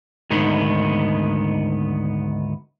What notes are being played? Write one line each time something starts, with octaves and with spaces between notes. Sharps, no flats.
D2 G#2 D#3 B3